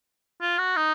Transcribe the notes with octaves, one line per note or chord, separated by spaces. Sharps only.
F4
F#4
D#4